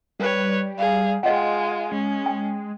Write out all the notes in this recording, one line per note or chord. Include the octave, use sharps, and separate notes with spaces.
G3 B4 C#5
G#4 F5
G#3 F4 D#5 F#5 G5
G#5
G#3 C#4
G5